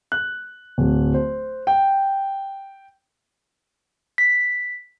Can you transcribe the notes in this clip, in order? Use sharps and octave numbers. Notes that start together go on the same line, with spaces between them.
F#6
D1
C5
G5
B6